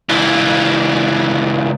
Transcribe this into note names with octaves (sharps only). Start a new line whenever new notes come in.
C#2 E3